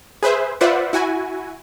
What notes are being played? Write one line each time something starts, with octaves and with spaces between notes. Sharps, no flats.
G#4 B4 C5 E5
F4 B4 C5 D5 E5 F#5
E4 F#4 G#5